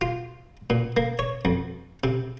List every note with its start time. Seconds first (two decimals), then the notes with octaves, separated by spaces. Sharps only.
0.01 F4
0.70 A#2
0.97 A#3
1.19 C#5
1.45 F2
2.04 C3